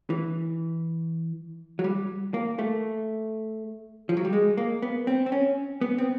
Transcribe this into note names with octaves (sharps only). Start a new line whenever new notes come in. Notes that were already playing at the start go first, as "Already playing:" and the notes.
E3
F#3
G3
A#3
A3
F3
F#3
G3
G#3
A#3
B3
C4
C4
C#4
B3
C4